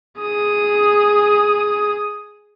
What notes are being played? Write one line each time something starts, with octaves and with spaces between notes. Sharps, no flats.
G#4 D#6